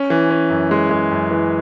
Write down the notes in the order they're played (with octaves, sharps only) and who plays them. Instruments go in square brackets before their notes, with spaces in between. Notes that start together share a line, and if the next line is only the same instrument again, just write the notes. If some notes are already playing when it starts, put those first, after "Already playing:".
Already playing: [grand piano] C#4
E3
C#4
F#2
G#3
G#3
F#2
E3